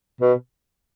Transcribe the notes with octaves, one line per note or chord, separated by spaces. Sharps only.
B2